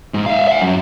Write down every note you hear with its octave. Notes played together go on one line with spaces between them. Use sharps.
G#2
E5 F5
E5 F#5
F#2